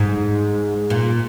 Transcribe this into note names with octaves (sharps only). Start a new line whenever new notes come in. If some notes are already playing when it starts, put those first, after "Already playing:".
Already playing: G#2
A#2